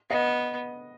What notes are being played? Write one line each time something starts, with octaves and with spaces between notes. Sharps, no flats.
B3 D#5